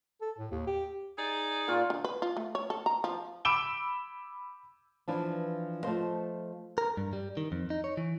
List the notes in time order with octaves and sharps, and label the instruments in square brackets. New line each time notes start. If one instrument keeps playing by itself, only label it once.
[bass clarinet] A4
A2
D#2
G4
[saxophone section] D#4 G#4 D5
[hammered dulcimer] A#2 F4 C#6
[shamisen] D3
B4
F4
A3
C#5
A4
A#5
F3
[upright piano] B5 D6 E6 D7 E7 G7
[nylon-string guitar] E3 F3 D4
F3 A3 C5 D#5
[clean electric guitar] A#4
G2
G3
D#3
F2
D#4
C#5
E3